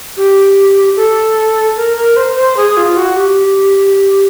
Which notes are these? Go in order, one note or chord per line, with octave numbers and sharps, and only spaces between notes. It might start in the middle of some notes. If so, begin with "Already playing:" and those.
G4
A4
A#4
A#4
C5
C5
G#4
F4
F#4
G4